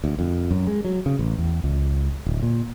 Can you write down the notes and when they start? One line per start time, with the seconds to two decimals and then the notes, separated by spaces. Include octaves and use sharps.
0.04 D2
0.19 F2
0.51 F#2
0.67 G#3
0.85 F#3
1.06 C#3
1.19 A1
1.38 E2
1.64 C#2
2.26 D1
2.43 A#2